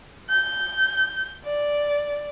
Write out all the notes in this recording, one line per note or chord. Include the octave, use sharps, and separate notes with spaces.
G6
D5